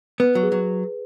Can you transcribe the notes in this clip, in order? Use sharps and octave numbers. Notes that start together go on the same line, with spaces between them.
B3 B4
F#3
G#4
F#3